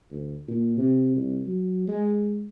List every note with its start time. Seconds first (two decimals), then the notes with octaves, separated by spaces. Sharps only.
0.11 D2
0.48 A#2
0.77 C3
1.16 C2
1.46 F#3
1.88 G#3